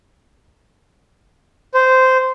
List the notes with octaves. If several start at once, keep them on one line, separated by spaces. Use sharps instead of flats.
C5